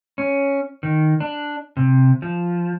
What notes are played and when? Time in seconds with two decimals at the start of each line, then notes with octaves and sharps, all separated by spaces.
0.18 C#4
0.83 D#3
1.20 D4
1.77 C3
2.22 F3